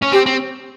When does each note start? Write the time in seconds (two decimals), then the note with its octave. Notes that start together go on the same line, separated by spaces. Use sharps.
0.02 C#4
0.12 C4 G4
0.26 C4